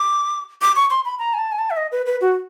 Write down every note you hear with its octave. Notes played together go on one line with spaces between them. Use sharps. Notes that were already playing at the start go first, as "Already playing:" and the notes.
Already playing: D6
D6
C#6
C6
B5
A#5
G#5
A5
G#5
A5
E5
D#5
B4
B4
F#4